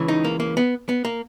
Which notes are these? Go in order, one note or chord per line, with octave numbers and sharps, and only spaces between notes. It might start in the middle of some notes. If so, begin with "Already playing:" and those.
Already playing: C#2 C#3 E3
D#4
A#3
A#3
B3
B3
A#3